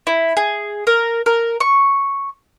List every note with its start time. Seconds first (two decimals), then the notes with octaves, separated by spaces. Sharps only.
0.07 E4
0.37 G#4
0.87 A#4
1.26 A#4
1.60 C#6